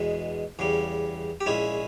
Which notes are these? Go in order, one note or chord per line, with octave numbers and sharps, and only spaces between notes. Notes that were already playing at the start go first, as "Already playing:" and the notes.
Already playing: E2 B2 G#3
E2 C#3 G3
G4
A#1 A#2 G#3 C#4 E4